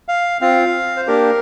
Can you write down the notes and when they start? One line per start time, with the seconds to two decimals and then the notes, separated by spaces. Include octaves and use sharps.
0.08 F5
0.41 C4 F4 F5
0.96 C5
1.07 A#3 D4 G4 A#4